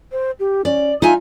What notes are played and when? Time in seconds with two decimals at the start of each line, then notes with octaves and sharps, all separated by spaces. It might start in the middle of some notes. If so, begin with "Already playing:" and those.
0.12 C5
0.40 G4
0.65 C#4 D5
1.02 D#4 F4 E5 G#5